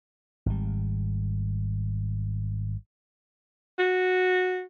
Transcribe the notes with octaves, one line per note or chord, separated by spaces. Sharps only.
G#1 G3
F#4